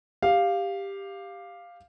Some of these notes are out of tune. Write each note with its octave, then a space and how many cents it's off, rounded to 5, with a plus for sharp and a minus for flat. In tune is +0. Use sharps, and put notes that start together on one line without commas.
G4 +10 F5 +0